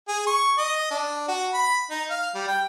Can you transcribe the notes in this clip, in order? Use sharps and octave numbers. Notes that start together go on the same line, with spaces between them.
G#4
C#6
D#5
D4
F#4
B5
D#4
F5
G3
G5